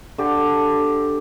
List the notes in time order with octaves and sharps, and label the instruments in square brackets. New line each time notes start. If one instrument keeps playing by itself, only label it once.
[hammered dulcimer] D3 G4